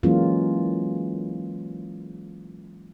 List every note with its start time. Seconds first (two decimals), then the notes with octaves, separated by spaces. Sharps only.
0.03 E3 F#3 G#3 A#3 C#4 F4